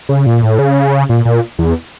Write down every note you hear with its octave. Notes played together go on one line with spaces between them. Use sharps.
C#3
A#2
A2
C#3
A#2
A#2
E2